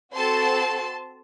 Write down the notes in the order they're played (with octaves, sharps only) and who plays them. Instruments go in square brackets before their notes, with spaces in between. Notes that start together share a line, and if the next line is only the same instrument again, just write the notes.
[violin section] C4 F#4 A4 A5 C6